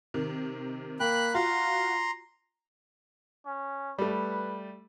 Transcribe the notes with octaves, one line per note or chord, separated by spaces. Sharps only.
C3 D#3
A#3 G5 B5 F#6
F4 F#4 A#5 C6
C#4
G3 A3 B4